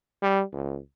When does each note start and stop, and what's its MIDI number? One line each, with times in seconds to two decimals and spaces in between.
0.22 0.42 55
0.52 0.77 37